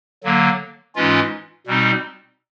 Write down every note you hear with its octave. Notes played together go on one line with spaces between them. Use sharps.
D3 F#3 A#3
G#2 E3 G#3 C#4 F4
B2 G3 C4 D#4